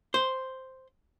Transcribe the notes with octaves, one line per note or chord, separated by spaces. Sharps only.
C5